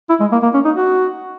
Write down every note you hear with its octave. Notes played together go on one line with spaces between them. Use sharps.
E4
G#3
A#3
A#3
C#4
D#4
F#4